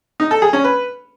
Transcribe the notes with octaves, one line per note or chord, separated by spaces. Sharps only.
D#4
A4
G#4
C#4
B4